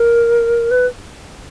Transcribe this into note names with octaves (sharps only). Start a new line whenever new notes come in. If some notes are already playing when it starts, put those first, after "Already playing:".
Already playing: A#4
B4